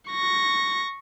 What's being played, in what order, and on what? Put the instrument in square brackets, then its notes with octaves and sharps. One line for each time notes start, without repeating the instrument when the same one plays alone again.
[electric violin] C#6 A#6